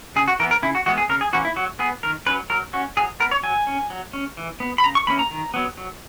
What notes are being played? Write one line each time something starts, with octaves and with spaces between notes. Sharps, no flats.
C#3 G#4
F#4
E3 B3 A#4
A#4
C#3 E4
F#4
E3 G#3 B3 F#4
G#4
C#3 A#4
G#4
E3 A#3 C#4 F#4
E4
F#3 F#4
B3 G#4
D#3 A#4
F#3 C#4 B4
F#3 A#4
C#4 F#4
F#3 G#4
B3 A#4
C#5
F#3 G#5
C#4
F#3
C#4
E3
B3
B5
C#3 A#5
C#6
E3 A#3 C#4 B5
A#5
D#3
F#3 B3
F#3